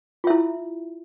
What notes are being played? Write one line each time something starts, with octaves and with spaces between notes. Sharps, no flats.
E4 F4 E5